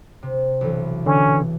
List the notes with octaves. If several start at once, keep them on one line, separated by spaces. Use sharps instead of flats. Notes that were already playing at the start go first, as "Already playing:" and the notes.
C3
B1 E3
D3 C#4